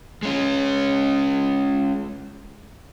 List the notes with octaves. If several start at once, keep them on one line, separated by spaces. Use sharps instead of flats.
G#3 C#4